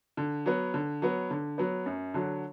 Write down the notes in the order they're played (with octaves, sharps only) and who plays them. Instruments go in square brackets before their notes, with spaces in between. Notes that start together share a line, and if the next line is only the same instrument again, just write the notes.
[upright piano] D3
F#3 B3
D3
F#3 B3
D3
F#3 B3
F#2
D3 F#3